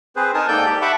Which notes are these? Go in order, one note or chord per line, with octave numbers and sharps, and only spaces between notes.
C4 G#4 B4 C5
D#4 A#4 G#5 A5 D#6
G#2 A#3 A4 D5 G5 G6
G4
E5 F#5 A5 B5 C#6 D6